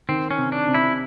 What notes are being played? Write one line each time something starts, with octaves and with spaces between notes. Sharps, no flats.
D#3 C4
C#4
C3
D4
C3
E4